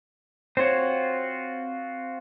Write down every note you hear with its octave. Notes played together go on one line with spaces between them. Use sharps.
C4 F4 F#4 C5 C#5